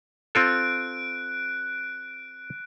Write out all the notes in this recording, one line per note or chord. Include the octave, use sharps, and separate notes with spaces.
C4 F4 A4 F#6 D7